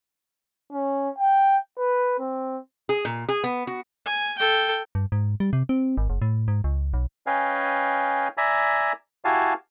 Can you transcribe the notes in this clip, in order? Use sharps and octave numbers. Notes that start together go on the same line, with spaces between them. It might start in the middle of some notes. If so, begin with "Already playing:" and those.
C#4
G5
B4
C4
G#4
A#2
G#4
B3
F#4
G#5
A4 G5
G2
G#2
G3
C3
C4
G#1
F#1
A2
G#2
C#2
B1
C#4 B4 D#5 F5 G5 G#5
D5 E5 G#5 A#5 B5
E4 F#4 G4 F5 G#5 A5